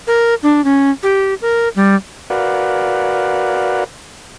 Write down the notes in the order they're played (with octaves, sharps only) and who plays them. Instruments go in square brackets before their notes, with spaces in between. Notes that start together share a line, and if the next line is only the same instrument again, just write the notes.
[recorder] A#4
D4
C#4
G4
A#4
G3
[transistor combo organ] F#4 A#4 B4 D5 F5 F#5